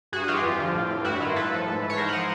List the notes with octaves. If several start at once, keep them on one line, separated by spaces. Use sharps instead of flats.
G2 F#4 G#4
F#4
E3 F4 G4
F2
D3 F3
A2
E3
G2 E4 F#4
D#3 F4
A2 A4 B4
F3
G#2
E3
C#5
G#2 A#4 C5
F#5
F3 D#5 F5